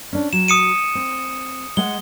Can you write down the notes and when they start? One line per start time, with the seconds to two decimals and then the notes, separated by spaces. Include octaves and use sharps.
0.13 C#4 D4
0.33 F#3 E7
0.48 D#6 C#7 D#7
0.95 C4
1.77 G#3 F#5 G7